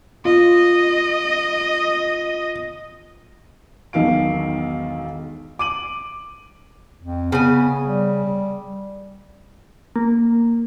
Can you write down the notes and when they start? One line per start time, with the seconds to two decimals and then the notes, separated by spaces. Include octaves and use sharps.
0.25 F4 D#5
3.93 E1 B1 D#3 F5 D7
5.59 D6 D#7 F#7
7.00 F2
7.32 C#3 B3 G#5
7.83 G3
9.96 A#3